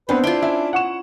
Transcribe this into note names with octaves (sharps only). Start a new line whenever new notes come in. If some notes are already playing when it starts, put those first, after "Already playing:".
B3 C4 D4 B4 C5
D4 E4 F4 D7 G7
C#4 E5
F#5 C#6 E7